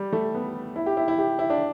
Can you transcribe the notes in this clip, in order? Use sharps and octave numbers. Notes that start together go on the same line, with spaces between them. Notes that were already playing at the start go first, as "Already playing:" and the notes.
Already playing: G3
A3
B3
E4
G4
E4
E4
G4
E4
D4